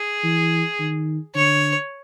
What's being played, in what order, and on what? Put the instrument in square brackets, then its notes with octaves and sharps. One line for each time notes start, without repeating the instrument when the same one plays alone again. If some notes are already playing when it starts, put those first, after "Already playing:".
Already playing: [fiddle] G#4
[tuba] E3
D#3
[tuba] D3 [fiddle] C#5